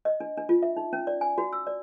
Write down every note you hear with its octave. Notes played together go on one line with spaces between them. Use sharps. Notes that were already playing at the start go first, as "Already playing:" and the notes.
D#5
D4
D4
F4
E5
D#4
C#4
D5
G#5
F#4
E6
D5